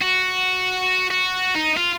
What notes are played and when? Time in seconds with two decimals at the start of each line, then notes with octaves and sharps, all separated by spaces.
0.02 F#4
1.11 F#4
1.55 D#4
1.77 F4